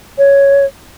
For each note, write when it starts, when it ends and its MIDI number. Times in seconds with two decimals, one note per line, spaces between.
0.18 0.65 73